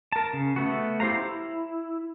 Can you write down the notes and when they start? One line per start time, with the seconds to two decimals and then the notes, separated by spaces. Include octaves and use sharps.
0.12 A#4 A5
0.33 C#3
0.56 A3 B3 F#4
1.00 E4 G4 C5 F5 A#5
1.23 E4